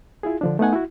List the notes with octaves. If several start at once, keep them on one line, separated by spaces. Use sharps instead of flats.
E4 F4 G#4
D3 F3 D4
A3 B3 D#4 F#5 G#5
E4 F#4